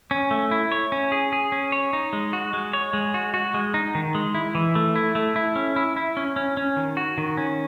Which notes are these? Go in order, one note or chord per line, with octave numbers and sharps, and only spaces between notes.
C#4
A3
E4
C#5
C#4
G#4
G#4
C#4
C#5
D#4
G#3
F#4
G#3
C#5
G#3
F#4
F#4
G#3
D#4
D#3
G#3
E4
E3
A3
E4
A3
E4
C#4
E4
E4
C#4
C#4
C#4
D#3
F#4
D#3
C#4